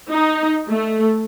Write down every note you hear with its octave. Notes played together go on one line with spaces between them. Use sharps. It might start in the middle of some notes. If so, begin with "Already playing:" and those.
D#4
A3